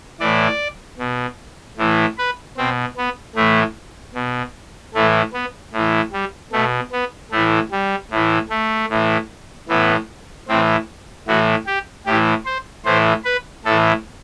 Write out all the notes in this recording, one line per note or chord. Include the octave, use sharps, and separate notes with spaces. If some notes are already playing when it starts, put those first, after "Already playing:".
A2 E3 D5
B2
A2 E3
B4
B2 C4
B3
A2 E3 A3
B2
A2 E3 A3
B3
A2 E3
G3
B2 A3
B3
A2 E3 A3
G3
A2 E3
A3
A2 E3
A2 E3 B3
A2 E3 C4
A2 E3 F#4
G4
A2 E3 G4
C5
A2 E3 C5
B4
A2 E3 A4